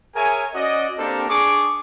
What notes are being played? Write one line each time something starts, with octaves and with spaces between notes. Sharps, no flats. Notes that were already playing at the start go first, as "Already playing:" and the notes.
G#4 A#4 C#5 E5 G#5
C#4 F#4 D5 D#5
A#3 C4 D4 G4 A4 A#4
D4 G#4 C#6 D6